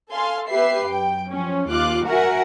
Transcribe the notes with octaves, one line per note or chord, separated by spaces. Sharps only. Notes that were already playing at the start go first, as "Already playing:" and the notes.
A4 F5 G#5 C6
B3 G4 B4 E5 C7
F#2 G5
F3 C#4
D#2 F4 F5 D6 F#6
F#4 A#4 E5 F#5 G#5